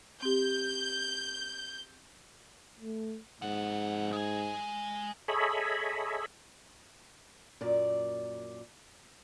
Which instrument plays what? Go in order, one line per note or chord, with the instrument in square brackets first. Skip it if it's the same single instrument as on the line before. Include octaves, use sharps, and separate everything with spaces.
[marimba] C4 G4 [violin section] G6
[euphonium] A3
[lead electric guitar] F2 F#5 [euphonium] G#2
[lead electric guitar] G#3 G#5
[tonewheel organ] G#4 A4 C#5 D#5 E5 B5
[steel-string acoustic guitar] F#2 A#2 D5